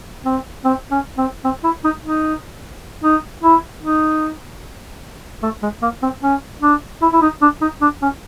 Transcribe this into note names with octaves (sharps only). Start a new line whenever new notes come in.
C4
C4
C#4
C4
C4
E4
D#4
D#4
D#4
E4
D#4
A3
G#3
A#3
C4
C#4
D4
E4
E4
D#4
D4
D#4
D4
C#4